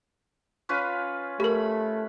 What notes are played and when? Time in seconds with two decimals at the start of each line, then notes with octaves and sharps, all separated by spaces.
0.69 C#4 F4 B4
1.40 A3 G4 A#4 B5